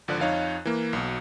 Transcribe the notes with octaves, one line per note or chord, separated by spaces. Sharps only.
G#1 D3 F3 D5 F#6
F2 D#4 C#5 F5
E3 A#3
B1 B2